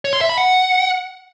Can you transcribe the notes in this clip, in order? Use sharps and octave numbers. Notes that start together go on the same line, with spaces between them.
C#5
C6
E5
B5
F#5